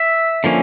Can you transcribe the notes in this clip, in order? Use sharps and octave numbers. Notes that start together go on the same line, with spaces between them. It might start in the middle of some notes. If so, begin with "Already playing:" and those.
Already playing: E5
D3 F3 A#3 C#4